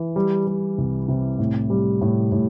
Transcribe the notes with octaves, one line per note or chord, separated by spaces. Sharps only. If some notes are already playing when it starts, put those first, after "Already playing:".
Already playing: E3
G3
G3
C2
C3
A2
G3
A2
A2